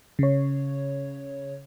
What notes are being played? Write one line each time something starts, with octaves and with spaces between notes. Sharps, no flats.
C#3 C#5